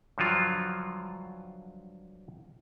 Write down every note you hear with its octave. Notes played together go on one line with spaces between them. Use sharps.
G2 D3 F3 F#3 F4